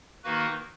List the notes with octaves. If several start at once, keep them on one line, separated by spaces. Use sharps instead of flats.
D#3 A#3 D#4 F#4 B4